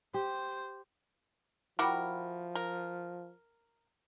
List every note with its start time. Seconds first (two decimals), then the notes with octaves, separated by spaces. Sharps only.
0.14 G4 C5
1.79 F3 E4 F#4 A#4 G5 B5 D6
2.55 A#4